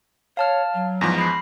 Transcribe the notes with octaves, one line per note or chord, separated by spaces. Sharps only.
C#5 F5 A5 F6
F#3
E2 G#2 F3 A#6
B5 C7